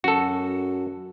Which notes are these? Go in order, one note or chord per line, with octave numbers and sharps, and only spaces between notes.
F#2 F#4 A4